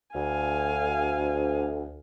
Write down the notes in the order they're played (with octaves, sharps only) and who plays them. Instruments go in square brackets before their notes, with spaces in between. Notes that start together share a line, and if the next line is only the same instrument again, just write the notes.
[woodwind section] D2 [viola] F5 G#5